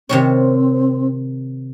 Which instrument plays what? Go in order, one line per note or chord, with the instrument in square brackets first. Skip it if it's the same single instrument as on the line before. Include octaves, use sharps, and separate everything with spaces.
[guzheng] C3 D#3 C#5 [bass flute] C4